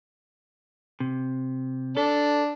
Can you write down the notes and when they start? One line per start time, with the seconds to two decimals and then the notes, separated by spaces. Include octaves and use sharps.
1.00 C3
1.97 D4 A4